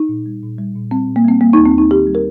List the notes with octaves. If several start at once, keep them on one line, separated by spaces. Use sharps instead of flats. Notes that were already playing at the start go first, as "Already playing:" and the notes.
Already playing: D#4
A#2
G3
A#2
G3
A#2
G3 C4
A#2
A#3
G3 C4
G3 A#3
D#4
D#2
C4
D#2 D#4
D#3 G4
G3
A#4